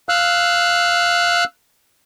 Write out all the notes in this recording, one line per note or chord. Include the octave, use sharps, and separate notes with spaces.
F5 E6 F#6